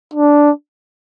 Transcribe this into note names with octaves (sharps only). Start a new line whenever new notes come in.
D4